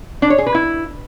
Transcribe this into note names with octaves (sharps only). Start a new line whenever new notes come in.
D4
C#5
G#4
B4
E4